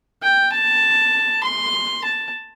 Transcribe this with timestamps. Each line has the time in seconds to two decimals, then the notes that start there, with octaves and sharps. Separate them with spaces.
0.22 G5
0.52 A5
1.43 C6
2.04 A5